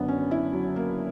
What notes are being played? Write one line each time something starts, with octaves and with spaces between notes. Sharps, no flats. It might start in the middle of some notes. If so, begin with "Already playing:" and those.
Already playing: F#1 F#2 D3 B3 D4
C#4
E4
F#3
A#3